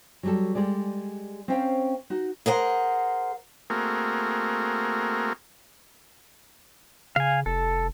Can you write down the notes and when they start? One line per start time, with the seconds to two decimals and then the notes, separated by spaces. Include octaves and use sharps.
0.23 F#3 G3 A4
0.55 G3 G#3 G#4 D5
1.48 C4 C#4 C5 F5 G5
2.10 D#4 F#4
2.46 G#4 A#4 C5 F#5
3.70 A3 A#3 C4 F#4 G#4 A#4
7.16 C#3 F5 G#5
7.46 F1 A4